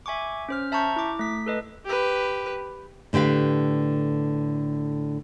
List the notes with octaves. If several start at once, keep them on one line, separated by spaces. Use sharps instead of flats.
E5 G#5 C#6 D6
C#4 C5 F6
E5 A5 A#5 C#6 G6
E4 D6
A3 B6
A4 B4 D#5
G4 B4
A2 D3 G4 B4 F5